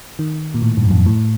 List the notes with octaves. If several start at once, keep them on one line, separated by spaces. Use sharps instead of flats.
D#3
A#2
A2
G2
F#2
F2
A2